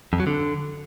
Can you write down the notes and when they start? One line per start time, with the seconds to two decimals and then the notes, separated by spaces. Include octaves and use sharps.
0.13 F2
0.20 F#3
0.27 D3